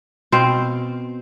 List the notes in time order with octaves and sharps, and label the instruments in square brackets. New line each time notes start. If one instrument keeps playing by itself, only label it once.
[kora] B2 C4 C5 F5